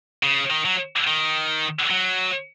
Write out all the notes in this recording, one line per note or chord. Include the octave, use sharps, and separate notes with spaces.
C#3
D#3
F#3
D#3
F#3